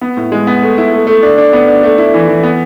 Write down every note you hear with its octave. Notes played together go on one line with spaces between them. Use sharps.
B3
A2
G#3
B3
A3
E4
A3
A3
D4
D4
B3
D4
A3
E4
E3
E3
B3